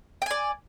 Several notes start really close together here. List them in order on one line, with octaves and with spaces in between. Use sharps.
G5 G#5 D5